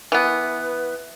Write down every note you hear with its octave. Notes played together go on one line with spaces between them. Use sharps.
E3 B3